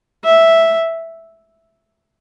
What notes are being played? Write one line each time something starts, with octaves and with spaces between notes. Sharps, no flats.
E5